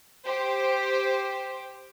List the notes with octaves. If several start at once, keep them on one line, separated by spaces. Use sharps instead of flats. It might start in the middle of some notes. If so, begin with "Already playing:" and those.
G4 C5